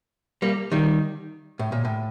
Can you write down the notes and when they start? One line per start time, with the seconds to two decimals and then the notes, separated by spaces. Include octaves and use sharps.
0.42 G3 A#3
0.72 D#3 G3
1.59 A2
1.72 A#2
1.85 A2